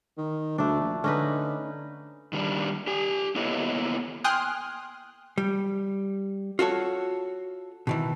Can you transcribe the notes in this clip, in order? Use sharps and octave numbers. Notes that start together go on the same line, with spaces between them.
D#3
D2 A3 D4
A#1
D3 C#4 D#4 B4
D#3 G3 D4
G4 G#5
A#3 B3 E4 A4 C#5 D#5
G5 G#5 C6 D#6 F6 F#6
G3
F4 F#4 A4 C#5
B2 D#3 E3